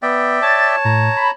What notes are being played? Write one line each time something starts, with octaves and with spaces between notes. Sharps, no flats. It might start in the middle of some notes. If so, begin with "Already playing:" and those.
B3 D5 E5 G5
C#5 A5 A6
A2 A#5
B5